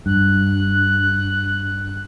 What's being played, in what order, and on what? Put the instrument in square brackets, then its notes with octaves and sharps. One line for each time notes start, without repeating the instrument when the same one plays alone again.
[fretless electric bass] G2 [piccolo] F#6